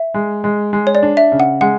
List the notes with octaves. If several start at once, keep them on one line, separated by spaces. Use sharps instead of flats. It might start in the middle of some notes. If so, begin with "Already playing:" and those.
Already playing: E5
G#3
G#3
G#3
C#5
D5
D4
E5
C#3
F#5
G#3 F#5